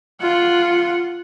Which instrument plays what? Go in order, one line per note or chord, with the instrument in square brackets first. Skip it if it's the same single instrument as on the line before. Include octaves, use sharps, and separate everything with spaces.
[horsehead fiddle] F4 F#5